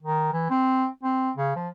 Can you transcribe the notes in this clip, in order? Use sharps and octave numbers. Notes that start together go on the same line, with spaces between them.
D#3
E3
C4
C4
C#3
F3